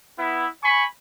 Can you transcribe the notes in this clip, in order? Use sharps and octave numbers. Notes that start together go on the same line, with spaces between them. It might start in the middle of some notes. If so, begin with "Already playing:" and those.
B3 E4
G#5 B5 C#6